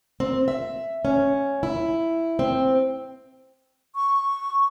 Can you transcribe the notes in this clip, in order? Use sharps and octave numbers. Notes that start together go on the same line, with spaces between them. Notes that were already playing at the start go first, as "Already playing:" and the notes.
C4
E5
C#4
E4
C4
C#6